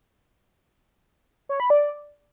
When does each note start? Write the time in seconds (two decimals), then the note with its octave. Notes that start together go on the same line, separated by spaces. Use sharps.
1.49 C#5
1.60 B5
1.70 D5